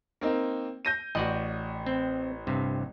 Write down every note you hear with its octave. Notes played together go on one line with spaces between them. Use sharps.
A#3 C4 D#4
G6 A#6 D#7
A1 F#4 D5 D#5
C4
G2 C3